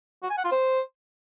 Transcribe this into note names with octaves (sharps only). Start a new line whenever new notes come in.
F#4
G#5
F#5
F4
C5